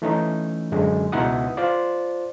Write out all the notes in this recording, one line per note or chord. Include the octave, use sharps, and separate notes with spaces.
E3 A3 C#4 D#4
F#2 D3 G#3
C#2 B2 D#4 E4 F#5 D#6
F4 C5 D5